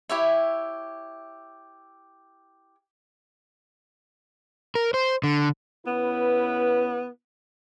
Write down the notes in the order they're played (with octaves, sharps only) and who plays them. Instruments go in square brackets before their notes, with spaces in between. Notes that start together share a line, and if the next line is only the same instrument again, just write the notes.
[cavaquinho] E4 G4 C#5 E5
[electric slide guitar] A#4
C5
D3
[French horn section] C#3 E4 B4 [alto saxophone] B3